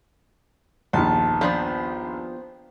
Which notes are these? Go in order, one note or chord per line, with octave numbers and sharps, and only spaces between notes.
A#1 D#2 B3 A5
F3 B3 D4 G4 C5